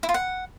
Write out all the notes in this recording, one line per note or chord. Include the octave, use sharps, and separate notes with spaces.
E4
F4
F#5